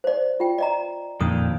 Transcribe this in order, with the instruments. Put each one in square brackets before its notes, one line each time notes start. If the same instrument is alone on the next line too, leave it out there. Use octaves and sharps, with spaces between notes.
[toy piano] C5 D5
F4 G5
D5 D#5 A#5
[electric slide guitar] F2 A#2 D#3 [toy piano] D#6